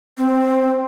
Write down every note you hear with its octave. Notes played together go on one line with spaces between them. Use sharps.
C4